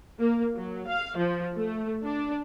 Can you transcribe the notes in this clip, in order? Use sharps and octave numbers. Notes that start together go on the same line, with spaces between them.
A#3
F#3
F5
F3
A3
D4